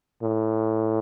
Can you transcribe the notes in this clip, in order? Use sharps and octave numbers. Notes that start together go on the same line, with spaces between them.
A2